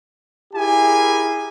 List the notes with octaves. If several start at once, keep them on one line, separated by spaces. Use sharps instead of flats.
E4 G4 G#4 A#4 G#5